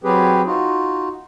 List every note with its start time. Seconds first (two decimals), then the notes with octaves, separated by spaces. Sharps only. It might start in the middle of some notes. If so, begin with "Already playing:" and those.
0.04 F#3 C4 G4 G#4 B4
0.46 D#4 F4 F#4